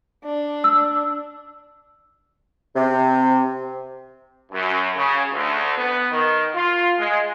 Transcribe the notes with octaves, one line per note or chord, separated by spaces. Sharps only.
D4
E6
C3
F#2
C#3
D2
B3
D#3
F4
G#3